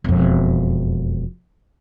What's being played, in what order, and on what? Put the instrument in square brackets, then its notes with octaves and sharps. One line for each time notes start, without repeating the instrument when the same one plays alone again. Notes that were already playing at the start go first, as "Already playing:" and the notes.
[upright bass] E1 F2